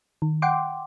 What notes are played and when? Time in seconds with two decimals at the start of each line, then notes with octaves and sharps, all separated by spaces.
0.22 D#3
0.42 F#5 G5 C6 D6